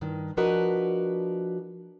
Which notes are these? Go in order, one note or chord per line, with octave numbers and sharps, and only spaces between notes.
G2 D#3
F3 D4 F#4 A#4 B4 D#5